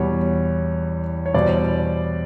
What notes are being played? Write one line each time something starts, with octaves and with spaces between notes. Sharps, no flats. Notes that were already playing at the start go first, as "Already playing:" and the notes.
Already playing: E2 B2 G3 C#5
C#5
E2 B2 G3 C5 D5